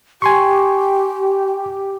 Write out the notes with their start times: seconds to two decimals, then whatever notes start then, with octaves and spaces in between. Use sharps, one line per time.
0.22 G4 G#5 C6 C#6